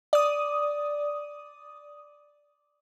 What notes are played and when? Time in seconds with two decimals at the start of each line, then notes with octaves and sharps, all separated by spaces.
0.13 D5 D#6